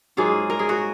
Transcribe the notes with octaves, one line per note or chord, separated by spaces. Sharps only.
G#2 F#3 A#3 F4 G#4
A#4
G#4
F#4 A#4